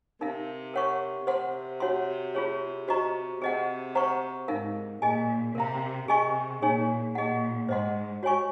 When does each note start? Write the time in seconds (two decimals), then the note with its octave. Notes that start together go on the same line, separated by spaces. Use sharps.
0.21 C3 D#4 A#4 F5
0.74 A#4 C#5 F#5 C#6
1.27 C3 C5 F#5 C6
1.80 F#4 C#5 F#5 C6
2.35 F4 G#4 C#5
2.88 F#4 C5 D#5 A#5 C#6
3.42 C3 G#4 C5 D#5 F#5
3.95 C5 F#5 A#5 C#6
4.48 G#2 D#4 A#4 F5
5.01 A#2 G#4 D#5 G#5
5.55 C3 A#4 F5 A#5
6.08 C3 G#4 D#5 G#5 C#6
6.62 A#2 D#4 G#4 C#5 G#5
7.15 A#2 G#4 D#5 F#5
7.69 G#2 C5 D#5 F#5 C6
8.23 F#4 C#5 G#5 C#6